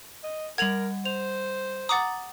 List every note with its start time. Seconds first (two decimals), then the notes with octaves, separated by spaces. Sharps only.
0.24 D#5
0.58 G3 A#4 F#5 G#6 F7 F#7
1.05 C5 F7
1.89 F#5 A#5 D6 D#6 A6